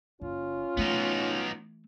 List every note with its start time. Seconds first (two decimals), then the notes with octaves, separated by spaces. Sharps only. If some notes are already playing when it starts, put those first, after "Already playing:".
0.22 F#1 C#4 F4
0.77 E3 A3 B3 D#4